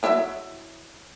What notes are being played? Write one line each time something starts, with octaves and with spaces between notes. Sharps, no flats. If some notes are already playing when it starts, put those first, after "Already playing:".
F#3 E4 E5